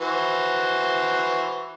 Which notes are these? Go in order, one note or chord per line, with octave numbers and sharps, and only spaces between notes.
E3 F#4 C5